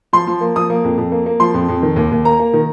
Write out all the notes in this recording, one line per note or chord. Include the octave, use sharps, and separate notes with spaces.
F3 C6
F3
A#3
F3 D#6
A#3
F2
F2
A#3
A#3
F3 C6
F2
F2
D#3
D#2
D#2
A#3 A#5
A#3
D#3